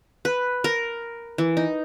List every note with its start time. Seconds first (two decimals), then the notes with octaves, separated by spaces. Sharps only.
0.25 B4
0.64 A#4
1.38 E3
1.57 D#4